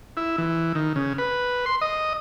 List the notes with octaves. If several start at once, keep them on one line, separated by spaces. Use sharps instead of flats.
E4
E3
D#3
C#3
B4
C6
D#5